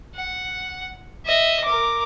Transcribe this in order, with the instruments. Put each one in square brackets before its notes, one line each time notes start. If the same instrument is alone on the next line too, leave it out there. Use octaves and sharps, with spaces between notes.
[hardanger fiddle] F#5
D#5 E5
A#4 D6